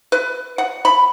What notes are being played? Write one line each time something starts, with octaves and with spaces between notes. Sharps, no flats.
B4
F#5
B5